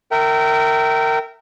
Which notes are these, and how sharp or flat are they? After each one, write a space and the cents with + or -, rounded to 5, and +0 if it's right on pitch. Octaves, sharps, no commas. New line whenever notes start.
A#4 -20 E5 +0 G5 -25